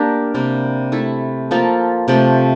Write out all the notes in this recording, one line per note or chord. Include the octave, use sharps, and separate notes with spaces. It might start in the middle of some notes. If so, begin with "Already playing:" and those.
Already playing: A#3 D4 G4 A#4
C3 G3 A#3
A3 E4 A4
F3 A#3 F4 A4
C3 F3 A3